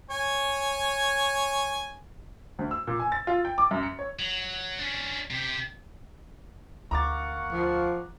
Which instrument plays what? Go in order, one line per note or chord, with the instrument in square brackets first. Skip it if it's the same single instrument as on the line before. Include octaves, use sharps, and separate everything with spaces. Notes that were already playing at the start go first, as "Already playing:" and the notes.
[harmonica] C#5 G#5
[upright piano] D2
E6
A#2
G#5
A6
F4
G5
D6
F#2
C#7
C#5
[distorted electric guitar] F#3
C#4 D4
C3 G4
[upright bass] D2 [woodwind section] A#3 F#5 C#6 [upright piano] A#5 D6 A6
[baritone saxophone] F3